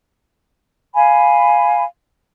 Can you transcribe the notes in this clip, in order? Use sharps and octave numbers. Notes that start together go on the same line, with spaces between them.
F5 G#5 B5